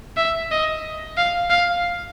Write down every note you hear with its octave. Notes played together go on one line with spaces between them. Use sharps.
E5
D#5
F5
F5